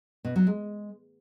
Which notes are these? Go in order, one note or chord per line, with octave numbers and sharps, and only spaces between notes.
B2
F#3
G#3